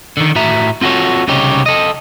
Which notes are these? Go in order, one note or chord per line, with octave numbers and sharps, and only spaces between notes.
D3 D#3
A2 F#4 E5 A#5
C4 F4 F#4 A4 C#5
C2 C#3 D#4 G4 C#5
A4 D#5